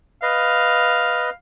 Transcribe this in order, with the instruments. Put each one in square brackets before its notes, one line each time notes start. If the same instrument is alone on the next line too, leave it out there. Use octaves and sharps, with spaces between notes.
[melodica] B4 D#5 [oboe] F5